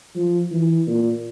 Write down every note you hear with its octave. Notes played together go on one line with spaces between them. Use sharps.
F3
E3
A#2